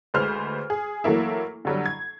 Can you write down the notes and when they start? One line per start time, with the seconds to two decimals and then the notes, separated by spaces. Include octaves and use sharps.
0.14 D2 G#3 B4 C5 F6
0.70 G#4
1.04 E3 F#3 A3 A#3 E4
1.65 D3 F#3 G3
1.86 G#6